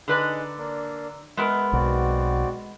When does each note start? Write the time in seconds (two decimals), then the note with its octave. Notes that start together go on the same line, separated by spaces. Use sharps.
0.08 D3 D#4 G#4 B4 D5
0.58 A#3 D4
1.37 G#3 B3 A#4 E5
1.73 B1 C4 F#4 D5